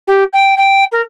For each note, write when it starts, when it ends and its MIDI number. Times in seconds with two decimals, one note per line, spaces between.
0.07 0.23 67
0.33 0.54 79
0.57 0.84 79
0.92 1.01 70